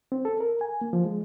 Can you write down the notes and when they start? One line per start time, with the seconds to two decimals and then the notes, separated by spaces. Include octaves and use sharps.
0.12 C4
0.25 A4
0.40 A#4
0.61 G#5
0.82 A#3
0.93 F3
1.05 G#3